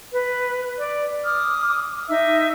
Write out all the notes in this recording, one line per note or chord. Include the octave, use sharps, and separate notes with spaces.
B4
D5
D6 D#6 F6
D#4 E5 E6